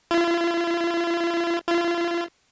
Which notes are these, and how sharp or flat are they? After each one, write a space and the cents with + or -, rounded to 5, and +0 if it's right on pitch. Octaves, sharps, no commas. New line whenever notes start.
F4 -45
F4 -35